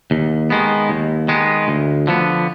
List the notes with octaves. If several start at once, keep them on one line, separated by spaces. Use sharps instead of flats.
D#2
D#3 G#3 B3
D#2
D#3 G#3 B3
D2
D3 F3 B3